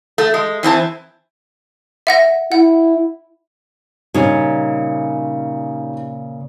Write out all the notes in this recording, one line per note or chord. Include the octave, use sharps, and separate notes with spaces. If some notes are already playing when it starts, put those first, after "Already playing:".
A3
G#3
E3 C4 E4 A5
E5 F#5 A#6
E4 F#5
A#2 C#3 G3 C#4 D#4